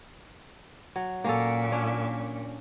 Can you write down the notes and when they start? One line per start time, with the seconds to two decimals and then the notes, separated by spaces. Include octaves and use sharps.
0.96 F#3
1.24 A#2 A#3 C#4 A4
1.72 C#4 D4